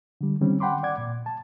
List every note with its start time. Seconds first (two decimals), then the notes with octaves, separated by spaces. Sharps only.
0.21 D3 G3
0.41 D3 D#3 G3 C4 C#4
0.60 F#5 G5 B5 C6 D6
0.83 D5 F#5 D6 G#6
0.98 A#2
1.26 A5